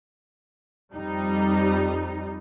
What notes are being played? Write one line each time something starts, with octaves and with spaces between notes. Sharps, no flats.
F2 G3 D#4